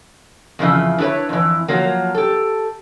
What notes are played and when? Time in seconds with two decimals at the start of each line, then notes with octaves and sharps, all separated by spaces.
0.59 F2 C#3 E3 F3
0.98 D4 E4 A4 B4 C#5
1.29 F2 E3
1.68 F3 F#3 A#3
2.15 G4 A4